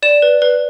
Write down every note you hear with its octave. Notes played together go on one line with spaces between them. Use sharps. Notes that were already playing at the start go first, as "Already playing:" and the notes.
D5 E7
B4
B4